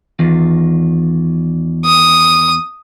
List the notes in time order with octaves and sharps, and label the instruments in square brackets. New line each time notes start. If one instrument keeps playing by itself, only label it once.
[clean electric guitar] E2 D#3 F4
[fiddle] D#6